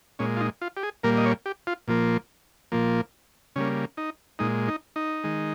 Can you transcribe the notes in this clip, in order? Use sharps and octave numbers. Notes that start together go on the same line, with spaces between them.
A#2 G#3 C#4
F4
D#4
F4
G4
G#4
A#2 G3 A#3 A#4
D#5
C#5
G4
F4
A#2 F3 A#3
A#2 F3 A#3
C#3 G3 A#3 C#4
D#4
A#2 G#3 D#4
D#4
D#4
D#3 G#3